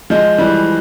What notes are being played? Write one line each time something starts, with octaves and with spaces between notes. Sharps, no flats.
F3 G#3
E3 G3